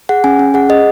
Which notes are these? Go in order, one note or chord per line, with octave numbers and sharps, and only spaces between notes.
G#4 F#5
C#4 G#5
C#4
G#4 F#5
G#4 D#5